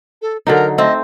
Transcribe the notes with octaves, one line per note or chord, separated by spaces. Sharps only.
A4
D3 F#3 D#4 A#4
A3 C4 D#5